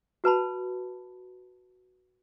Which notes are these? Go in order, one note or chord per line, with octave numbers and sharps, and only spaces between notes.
F#4 B4 A5 B5